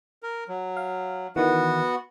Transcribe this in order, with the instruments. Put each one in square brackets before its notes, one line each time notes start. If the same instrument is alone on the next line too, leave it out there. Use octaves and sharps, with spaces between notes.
[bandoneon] A#4
F#3
[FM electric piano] F5
[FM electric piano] D#3 E3 [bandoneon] B3 F#4 F#5